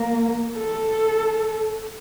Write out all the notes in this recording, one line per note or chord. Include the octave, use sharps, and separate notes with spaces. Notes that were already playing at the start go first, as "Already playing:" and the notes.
Already playing: A#3
A4